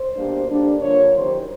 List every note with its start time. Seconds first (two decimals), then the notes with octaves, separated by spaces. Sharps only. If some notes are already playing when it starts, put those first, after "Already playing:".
Already playing: C5
0.15 B2 G3 A#3 D4
0.48 D3 G3 A#3 D4
0.80 D3 F3 A#3 C#5
1.12 F#2 D#3 G3 C5